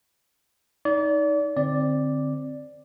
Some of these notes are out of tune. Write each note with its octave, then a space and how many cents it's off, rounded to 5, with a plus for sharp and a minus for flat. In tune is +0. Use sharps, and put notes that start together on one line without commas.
D#4 +15 D5 -35
D3 +10 C4 +0 D5 +0